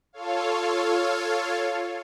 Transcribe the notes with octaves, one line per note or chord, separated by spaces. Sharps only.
F4 A4 C#5 F5